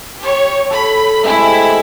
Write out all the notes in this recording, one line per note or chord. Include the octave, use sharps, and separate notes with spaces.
G4 C#5
A4 B5
C3 G#3 A3 E4